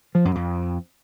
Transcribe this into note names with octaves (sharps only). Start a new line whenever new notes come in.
F3
F#2
F2